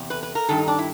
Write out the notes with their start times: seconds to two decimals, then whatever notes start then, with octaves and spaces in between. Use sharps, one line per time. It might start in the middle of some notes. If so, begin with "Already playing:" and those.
Already playing: E2 C3
0.10 B4
0.23 B4
0.35 A#4
0.49 G2 D#3 A4
0.58 D#4
0.68 D4
0.79 E4